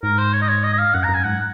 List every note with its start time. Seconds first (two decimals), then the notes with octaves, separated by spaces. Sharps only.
0.03 G#2 A#4
0.18 C5
0.33 C#5
0.42 D#5
0.48 C#5
0.63 D#5
0.74 D#5
0.79 F5
0.94 F#2 F#5
1.04 F#2 A#5
1.14 G#5
1.24 G#2 F#5